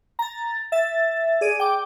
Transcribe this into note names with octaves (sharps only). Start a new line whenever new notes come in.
A#5 A6
E5 A6
G#4 D5 D#7
G5 D6